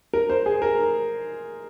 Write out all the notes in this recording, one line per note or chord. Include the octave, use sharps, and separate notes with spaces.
A#4
C5
G#4
A#4